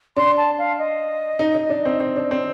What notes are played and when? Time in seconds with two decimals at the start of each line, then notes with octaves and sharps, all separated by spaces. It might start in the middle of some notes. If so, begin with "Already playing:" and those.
0.16 D4 C6
0.37 A5
0.58 F5
0.78 D#5
1.39 D#4
1.55 D#4
1.69 D4
1.85 C4
2.00 C4
2.16 D4
2.31 C4